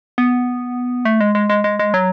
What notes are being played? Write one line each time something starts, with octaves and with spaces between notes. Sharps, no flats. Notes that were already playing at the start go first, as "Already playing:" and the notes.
B3
A3
G#3
G#3
G#3
G#3
G#3
F#3